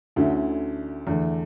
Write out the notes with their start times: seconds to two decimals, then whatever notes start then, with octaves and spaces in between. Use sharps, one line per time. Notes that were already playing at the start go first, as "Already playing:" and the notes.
0.16 D2 D3 A3 C#4 E4
1.07 E2 D3 A3